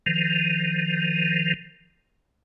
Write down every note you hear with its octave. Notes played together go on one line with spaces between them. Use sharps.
D#3 F3